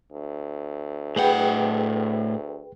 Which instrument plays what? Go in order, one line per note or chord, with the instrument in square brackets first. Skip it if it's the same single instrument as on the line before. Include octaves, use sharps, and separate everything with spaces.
[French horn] D2
[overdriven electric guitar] A2 F#5 [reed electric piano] G#4 B4 G5